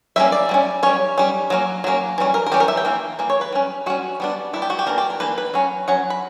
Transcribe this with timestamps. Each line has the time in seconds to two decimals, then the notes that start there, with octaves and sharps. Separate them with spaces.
0.16 G3 A#3 C#4 E5
0.32 D5
0.49 G3 A#3
0.54 C#4
0.83 G3 C#4 C#5
1.18 G3 C#4
1.50 F#3 A#3 C#4
1.84 F#3 A#3 C#4
2.18 E3 G3 C#4
2.34 A#4
2.46 A#4
2.52 E3 G3 C#4 G4
2.60 A#4
2.68 E5
2.77 G5
2.85 E3 A#3
3.19 E3 A#3
3.30 C#5
3.41 B4
3.52 G3 C#4
3.86 G3 C#4 F#4
4.20 G3 B3 D4
4.53 G3 B3 D4 E4
4.62 G4
4.70 F#4
4.79 G4
4.87 E3 A#3 D4 A#4
4.98 G4
5.10 A#4
5.20 E3 A#3 D4 B4
5.38 B4
5.54 F#3 C#4
5.88 F#3 C#4 F#5
6.10 B5